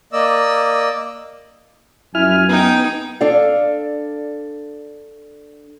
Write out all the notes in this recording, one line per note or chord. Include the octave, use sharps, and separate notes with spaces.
A#3 D5 D#5 E6
F#2 E4 G#5 F6
B3 D#4 G5
D4 A4 D5 F5